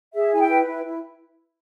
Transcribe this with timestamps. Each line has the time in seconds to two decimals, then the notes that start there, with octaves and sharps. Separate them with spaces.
0.15 G#4 E5
0.32 E4 G#5
0.40 G5
0.50 B4
0.66 E4
0.84 E4